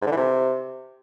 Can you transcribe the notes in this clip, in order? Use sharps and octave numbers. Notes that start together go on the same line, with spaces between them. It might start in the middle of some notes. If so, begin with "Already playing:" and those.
G#2
D3
E3
C3